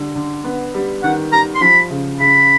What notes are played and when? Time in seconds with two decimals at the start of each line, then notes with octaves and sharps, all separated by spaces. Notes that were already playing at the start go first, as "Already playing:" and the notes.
Already playing: D3 G3
0.15 D3
0.44 B3
0.74 G3
1.03 D#3 F#5
1.32 G3 A#5
1.55 C6
1.61 F3 B5
1.90 C#3
2.20 C#3 B5